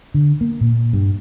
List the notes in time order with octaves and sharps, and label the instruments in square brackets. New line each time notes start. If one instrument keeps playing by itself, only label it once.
[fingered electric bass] D3
A#3
A#2
G2